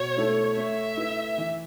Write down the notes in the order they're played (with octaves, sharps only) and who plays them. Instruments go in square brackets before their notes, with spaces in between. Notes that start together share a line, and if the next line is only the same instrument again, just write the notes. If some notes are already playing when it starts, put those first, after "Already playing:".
Already playing: [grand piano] B2 [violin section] C#5
[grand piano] A3 E4 A4
[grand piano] A3 [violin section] E5
[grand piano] E4 B4
E3